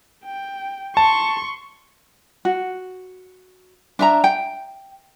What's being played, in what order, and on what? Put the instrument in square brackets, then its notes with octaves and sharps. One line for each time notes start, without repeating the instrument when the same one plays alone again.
[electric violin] G5
[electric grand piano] A5 [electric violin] C6 C#6
[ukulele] F#4
D4 E5 A#5
G5